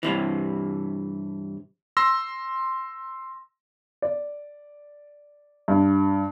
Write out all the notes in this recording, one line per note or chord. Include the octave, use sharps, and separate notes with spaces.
G2 C3 E3
C6 E6 A#6
D5
G2